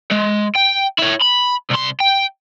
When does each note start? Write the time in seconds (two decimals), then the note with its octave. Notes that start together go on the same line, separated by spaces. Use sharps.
0.11 G#3
0.56 G5
0.99 E4 C#5
1.22 B5
1.71 C2 C6
2.00 G5